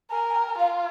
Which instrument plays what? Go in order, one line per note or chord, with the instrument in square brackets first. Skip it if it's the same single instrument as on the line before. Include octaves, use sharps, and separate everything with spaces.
[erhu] A#4 [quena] G#5
[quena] G#5
G5
[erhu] F4 [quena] F5